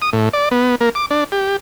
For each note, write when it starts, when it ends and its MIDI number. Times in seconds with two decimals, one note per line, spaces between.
0.02 0.10 87
0.13 0.29 45
0.33 0.49 74
0.51 0.75 59
0.81 0.89 58
0.95 1.06 86
1.11 1.24 62
1.32 1.57 67